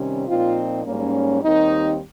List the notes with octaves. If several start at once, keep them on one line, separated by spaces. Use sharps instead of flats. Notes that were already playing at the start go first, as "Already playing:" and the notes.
Already playing: C3 D#3 G3 C#4
A#2 F3 C4 D#4 F4
G#2 G3 A#3 C#4
D#2 D#3 G3 C4 D#4